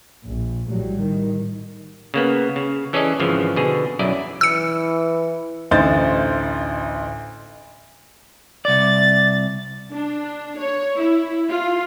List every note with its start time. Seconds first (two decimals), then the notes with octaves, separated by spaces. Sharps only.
0.25 A#1
0.68 A2 F#3 G3
1.01 D#3
2.14 C#3 A#3 B3
2.56 C#3
2.93 E3 C#4 G#4 A4 D5 D#5
3.19 G#1 C#3 E3 F3
3.56 B2 D3 G#4
3.99 B1 F#2 E4 D5 D#5
4.41 E3 E6 C#7
5.71 A1 D2 D#4 C5 G6 A6
8.65 C2 D5 A6
9.93 D4
10.60 C#5
10.97 E4
11.50 F4